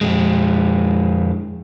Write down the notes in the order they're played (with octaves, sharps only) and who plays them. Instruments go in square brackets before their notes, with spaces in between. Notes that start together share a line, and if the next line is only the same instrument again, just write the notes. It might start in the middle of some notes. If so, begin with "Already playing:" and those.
[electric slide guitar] F2 G#3